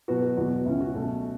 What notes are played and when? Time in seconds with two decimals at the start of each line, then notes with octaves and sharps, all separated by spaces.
0.08 B2 F#3 B3 F#4 B4
0.22 F#4
0.37 E2 B2 B3 F#4
0.65 C#2 C#3 F#3 C#4 E4
0.81 F#4
0.94 B2 A3 C#4